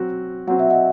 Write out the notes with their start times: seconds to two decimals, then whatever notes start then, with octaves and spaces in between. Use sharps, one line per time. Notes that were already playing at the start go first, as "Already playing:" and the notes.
Already playing: F#3 C4 F#4
0.47 F#3 C4 F#4 F#5
0.59 E5
0.70 D#5 F#5